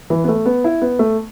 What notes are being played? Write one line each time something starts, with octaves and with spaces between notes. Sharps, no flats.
E3
B3
A3
B3
E4
B3
A3